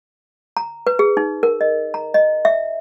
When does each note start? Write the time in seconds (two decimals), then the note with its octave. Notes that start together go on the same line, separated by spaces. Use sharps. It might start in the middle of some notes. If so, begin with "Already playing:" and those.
0.57 A#5
0.87 B4
0.99 G#4
1.17 D#4
1.43 A#4
1.61 D#5
1.94 A#5
2.14 D#5
2.45 E5